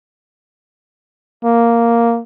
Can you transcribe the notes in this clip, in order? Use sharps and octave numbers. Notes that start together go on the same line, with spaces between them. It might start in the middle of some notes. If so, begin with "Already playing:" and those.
A#3